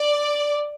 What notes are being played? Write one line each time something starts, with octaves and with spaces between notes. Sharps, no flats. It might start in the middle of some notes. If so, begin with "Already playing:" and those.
Already playing: D5